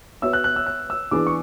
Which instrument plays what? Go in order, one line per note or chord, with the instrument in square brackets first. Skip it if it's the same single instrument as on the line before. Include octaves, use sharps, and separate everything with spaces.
[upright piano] B3 F#4 C#5 E5 [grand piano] E6
[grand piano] F#6
F#6
E6
F#6
E6
[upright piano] E3 B3 D4 G#4 B4 [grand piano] D6
[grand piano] C#6